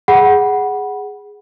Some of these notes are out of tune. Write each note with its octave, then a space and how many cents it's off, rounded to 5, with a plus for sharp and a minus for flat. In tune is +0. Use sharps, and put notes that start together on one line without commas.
G#4 +0 F#5 +10 B5 -20